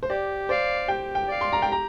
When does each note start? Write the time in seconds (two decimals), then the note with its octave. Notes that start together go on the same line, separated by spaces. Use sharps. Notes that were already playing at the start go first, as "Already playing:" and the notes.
0.03 C5
0.10 G4 D5
0.49 C5 D5 F5
0.88 G4 G5
1.15 G5
1.28 D5 F5
1.41 C6
1.53 A#5
1.62 G5
1.68 G4 A#5